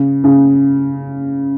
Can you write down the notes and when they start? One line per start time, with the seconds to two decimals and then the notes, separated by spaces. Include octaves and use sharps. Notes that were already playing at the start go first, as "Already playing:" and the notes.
Already playing: C#3
0.24 C#3